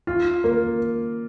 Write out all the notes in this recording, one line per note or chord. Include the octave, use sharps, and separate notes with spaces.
F4
A#3